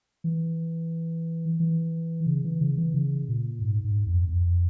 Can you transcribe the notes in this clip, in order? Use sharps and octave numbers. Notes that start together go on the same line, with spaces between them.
E3
E3
C#3
E3
C#3
E3
C#3
A#2
G#2
G#2
F2
F2